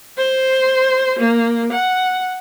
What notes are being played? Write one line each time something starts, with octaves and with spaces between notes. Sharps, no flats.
C5
A#3
F#5